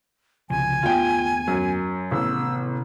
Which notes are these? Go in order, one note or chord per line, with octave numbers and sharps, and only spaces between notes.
C2 C#3 F3 G#5
D#2 A3 B3 F4 G5
F#2
A1 C3 D#3 B3 E6